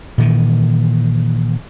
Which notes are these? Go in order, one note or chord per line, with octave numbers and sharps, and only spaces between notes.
A#2 D#3 E3